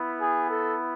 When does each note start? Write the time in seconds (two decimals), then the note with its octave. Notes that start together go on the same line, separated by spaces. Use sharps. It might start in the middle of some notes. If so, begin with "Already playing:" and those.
Already playing: B3 E4
0.21 G#4
0.50 A4